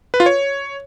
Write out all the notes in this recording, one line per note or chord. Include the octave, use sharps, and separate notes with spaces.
B4
F4
C#5